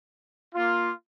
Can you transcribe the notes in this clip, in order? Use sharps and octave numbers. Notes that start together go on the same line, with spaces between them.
A#3 F4